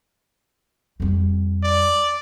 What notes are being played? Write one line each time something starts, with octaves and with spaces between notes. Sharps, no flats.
F2 G3
D5